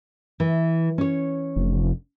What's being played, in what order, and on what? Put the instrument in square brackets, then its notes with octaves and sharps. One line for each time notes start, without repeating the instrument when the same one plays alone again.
[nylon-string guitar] E3
C#4 C#5
[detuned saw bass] F1